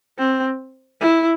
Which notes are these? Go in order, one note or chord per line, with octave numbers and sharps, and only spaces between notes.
C4
E4